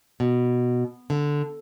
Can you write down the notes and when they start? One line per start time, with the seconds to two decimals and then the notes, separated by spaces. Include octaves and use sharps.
0.20 B2
1.10 D3